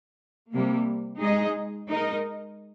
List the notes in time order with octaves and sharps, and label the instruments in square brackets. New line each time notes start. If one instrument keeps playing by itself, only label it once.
[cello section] C3 G3 A#3
G#3 D#4 G#4 D#5
G#3 D#4 A#4 D#5